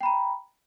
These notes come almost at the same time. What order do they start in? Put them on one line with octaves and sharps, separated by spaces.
G5 B5 A#5